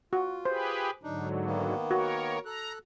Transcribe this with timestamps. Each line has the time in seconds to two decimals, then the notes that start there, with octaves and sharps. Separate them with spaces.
0.13 F4 F#4
0.45 G4 G#4 B4 C5
1.03 G#2 D3 F#3 D4 D#4
1.46 D#3 A#3 B3
1.91 F#4 A#4 C#5
2.45 A4 A#5 F#6